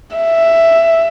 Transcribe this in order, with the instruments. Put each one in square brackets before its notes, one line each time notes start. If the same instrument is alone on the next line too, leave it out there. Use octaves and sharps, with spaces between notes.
[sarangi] E5